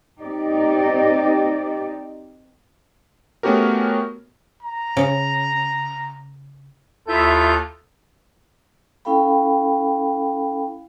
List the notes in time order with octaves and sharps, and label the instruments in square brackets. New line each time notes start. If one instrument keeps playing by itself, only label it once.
[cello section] C4 D#4 G4 D5
[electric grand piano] A3 B3 C#4 F#4 G4 A#4
[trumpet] A#5
[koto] C#3
[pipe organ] D#2 F4 G6 [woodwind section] E4 E5 [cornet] A4
[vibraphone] C#4 E4 A4 F5 G5 B5